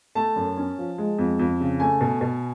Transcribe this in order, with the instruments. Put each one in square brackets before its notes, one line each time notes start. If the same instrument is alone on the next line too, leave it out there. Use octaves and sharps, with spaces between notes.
[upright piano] A3 A5
F#2
C#4
F3
G#3
F2
F2
C#3
A3 G#5
B2
B2